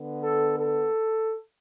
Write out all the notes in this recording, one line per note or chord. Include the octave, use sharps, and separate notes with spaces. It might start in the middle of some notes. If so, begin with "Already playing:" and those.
Already playing: D3 B3
A4
A4